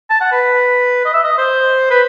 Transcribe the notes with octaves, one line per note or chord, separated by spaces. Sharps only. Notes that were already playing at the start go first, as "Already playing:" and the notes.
A5
F#5
B4
D#5
E5
D#5
C5
B4